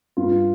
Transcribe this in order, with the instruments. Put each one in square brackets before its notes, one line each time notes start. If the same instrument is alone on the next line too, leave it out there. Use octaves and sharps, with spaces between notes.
[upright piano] G2 F4